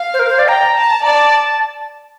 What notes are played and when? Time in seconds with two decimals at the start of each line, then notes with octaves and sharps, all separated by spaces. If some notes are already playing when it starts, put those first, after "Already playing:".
Already playing: F5
0.14 C5
0.19 A#4
0.29 C5
0.39 D5
0.48 G5 A#5
0.77 A5
1.05 D5 A5